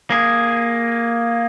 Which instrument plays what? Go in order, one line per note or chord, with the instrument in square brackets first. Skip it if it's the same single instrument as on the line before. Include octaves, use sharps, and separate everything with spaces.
[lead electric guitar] A#3 G#4